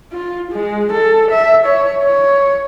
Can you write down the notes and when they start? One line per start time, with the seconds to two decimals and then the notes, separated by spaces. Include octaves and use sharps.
0.12 F4
0.51 G#3
0.92 A4
1.31 E5
1.65 C#5
2.04 C#5